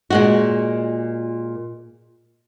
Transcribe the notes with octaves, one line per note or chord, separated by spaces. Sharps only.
A#2 G#3 F#4